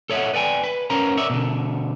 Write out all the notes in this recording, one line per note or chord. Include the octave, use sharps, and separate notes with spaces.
A4 C#5 D#5 E5 F#5
B4 D5 G5 G#5
B4
C#4 A#4 C5 A#5
A#4 C#5 D5 E5
B2 D3